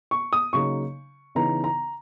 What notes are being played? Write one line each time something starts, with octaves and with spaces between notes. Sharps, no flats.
C#6
D#6
C#3 F#3 A#3 D#4 C#6
C#3 E3 B3 D#4 A#5
A#5